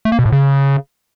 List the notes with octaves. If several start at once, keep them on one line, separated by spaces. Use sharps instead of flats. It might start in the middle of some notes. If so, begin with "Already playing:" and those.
A3
A#3
B2
A2
C#3